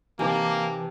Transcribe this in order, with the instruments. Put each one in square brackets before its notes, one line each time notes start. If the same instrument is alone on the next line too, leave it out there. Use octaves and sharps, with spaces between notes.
[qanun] C3 [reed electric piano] E3 D#4 B4 [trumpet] A#3 [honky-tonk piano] G#5 A5 D6